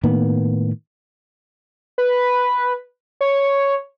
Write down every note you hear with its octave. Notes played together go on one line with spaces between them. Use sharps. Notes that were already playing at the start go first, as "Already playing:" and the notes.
A2 D#3 A#3 B3
B4
C#5